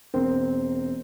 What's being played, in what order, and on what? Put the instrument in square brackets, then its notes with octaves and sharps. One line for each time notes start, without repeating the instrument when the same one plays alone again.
[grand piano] E1 C4 A#4